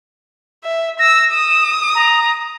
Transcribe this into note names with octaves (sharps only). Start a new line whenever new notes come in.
E5
E6 A#6
D#6 E7
A#5